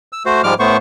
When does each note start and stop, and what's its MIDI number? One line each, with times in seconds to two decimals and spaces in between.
0.13 0.23 88
0.26 0.42 57
0.26 0.42 66
0.26 0.42 72
0.44 0.54 44
0.44 0.54 53
0.44 0.54 55
0.44 0.54 56
0.44 0.54 86
0.44 0.54 89
0.59 0.77 45
0.59 0.77 57
0.59 0.77 59
0.59 0.77 72
0.59 0.77 85